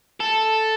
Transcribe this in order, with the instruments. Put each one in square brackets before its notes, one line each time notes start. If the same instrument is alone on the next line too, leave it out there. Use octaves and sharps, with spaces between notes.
[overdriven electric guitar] A4